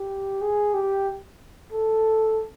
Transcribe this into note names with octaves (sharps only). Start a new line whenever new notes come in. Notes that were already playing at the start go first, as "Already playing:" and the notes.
Already playing: G4
G#4
G4
A4